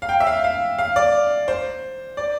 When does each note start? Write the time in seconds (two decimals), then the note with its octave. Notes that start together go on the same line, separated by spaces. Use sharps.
0.02 F5
0.09 G5
0.20 E5
0.27 F5
0.44 F5
0.78 F5
0.96 D5
1.48 C5
2.17 D5